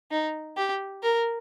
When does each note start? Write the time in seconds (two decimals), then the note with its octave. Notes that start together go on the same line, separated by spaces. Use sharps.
0.11 D#4
0.57 G4
1.03 A#4